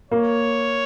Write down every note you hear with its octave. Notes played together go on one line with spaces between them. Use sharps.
A#3 C#5